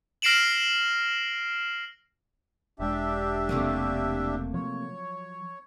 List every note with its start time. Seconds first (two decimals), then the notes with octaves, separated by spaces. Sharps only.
0.22 F6 A#6 C7 D7 E7 F#7
2.80 E1 G#3 D4 G4 E5
3.49 C3 A3 A#3
4.54 F3 F#3 C#5